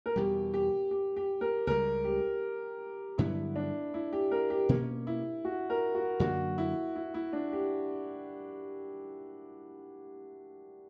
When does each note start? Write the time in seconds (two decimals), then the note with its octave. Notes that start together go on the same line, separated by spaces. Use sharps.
0.06 A#4
0.16 E2 B2 G3 G4
0.54 G4
0.91 G4
1.16 G4
1.41 A#4
1.67 C#2 C#3 G3 A#4
2.05 G4
3.18 G2 D3 F#3 B3 E4
3.56 D4
3.94 E4
4.13 G4
4.31 A#4
4.50 G4
4.69 B2 A#3 C#4
5.07 E4
5.45 F#4
5.70 A#4
5.95 F#4
6.20 F#2 D3 F#3 A#3 F#4
6.58 E4
6.96 E4
7.14 E4
7.33 D4
7.52 G4